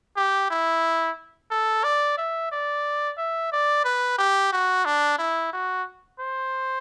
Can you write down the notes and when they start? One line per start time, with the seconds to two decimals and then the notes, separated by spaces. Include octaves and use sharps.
0.17 G4
0.51 E4
1.51 A4
1.84 D5
2.18 E5
2.52 D5
3.18 E5
3.52 D5
3.85 B4
4.18 G4
4.53 F#4
4.85 D4
5.19 E4
5.53 F#4
6.20 C5